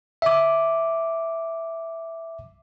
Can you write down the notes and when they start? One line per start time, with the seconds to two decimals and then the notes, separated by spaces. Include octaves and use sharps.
0.22 E5 D6